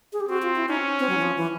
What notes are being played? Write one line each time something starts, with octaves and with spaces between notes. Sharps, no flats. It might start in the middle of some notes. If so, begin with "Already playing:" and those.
G#4
G4
C4 F#4
F4
E4
C#4 D#4
C4
F#3
E3
F3
E3